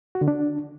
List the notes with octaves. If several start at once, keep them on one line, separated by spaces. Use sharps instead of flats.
F#4
D3
D4